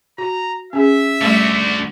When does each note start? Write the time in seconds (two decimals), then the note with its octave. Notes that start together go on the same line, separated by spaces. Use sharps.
0.18 F#4 A#5
0.73 C#4 G#4 E5
1.22 D3 G3 A3 F#4